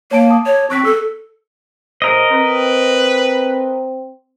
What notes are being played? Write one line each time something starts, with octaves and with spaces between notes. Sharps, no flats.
A#3 C#5 A5 D7
A5 D6 D#6
C#5
C4 C#6 F#6 B6
A4 E6
A2 G#4 A#4 C5 D#5
C4 B4